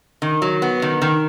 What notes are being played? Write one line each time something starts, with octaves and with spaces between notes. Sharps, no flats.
D#3
F#3
B3
D#3
D#3